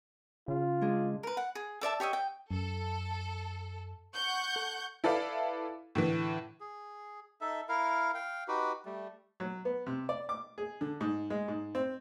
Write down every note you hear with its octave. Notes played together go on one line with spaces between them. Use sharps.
C#3 F4
G#3 D4 G#4
A#4 B4
F#5
G#4
A4 D5 E5 A5
G4 C#5 D#5 E5
G5
F#2 A4
F#5 C#6 G6
A4
E4 A4 B4 D5 F5
A2 D3 E3
G#4
D#4 A4 E5
E4 A#4 F5
F5 G5
D#4 F#4 G4 B4
G3 A3
F#3
B3
C3
D5
D6
G#4
D3
G#2
G#3
G#2
C4